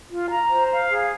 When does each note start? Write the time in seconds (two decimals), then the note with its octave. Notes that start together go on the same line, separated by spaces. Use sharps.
0.10 F4
0.30 A#5
0.50 C5
0.70 F5
0.89 G#4